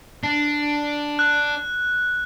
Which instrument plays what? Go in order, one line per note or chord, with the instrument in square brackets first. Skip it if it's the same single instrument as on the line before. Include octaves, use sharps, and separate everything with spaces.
[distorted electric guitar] D4
[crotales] F#6